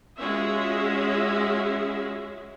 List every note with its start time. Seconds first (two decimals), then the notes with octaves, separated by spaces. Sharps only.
0.19 G#3 C#4 F4 F#4 G#4 E5